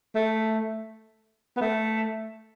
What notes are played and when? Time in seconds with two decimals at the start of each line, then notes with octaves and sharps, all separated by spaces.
0.15 A3
1.57 B3
1.61 A3